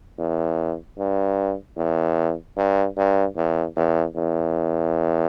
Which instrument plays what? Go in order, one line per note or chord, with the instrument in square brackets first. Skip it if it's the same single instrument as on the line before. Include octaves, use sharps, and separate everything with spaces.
[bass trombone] E2
G2
E2
G2
G2
E2
E2
E2